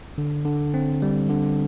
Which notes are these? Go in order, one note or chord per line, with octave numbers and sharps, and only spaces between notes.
D3
D3
C4
G3
D3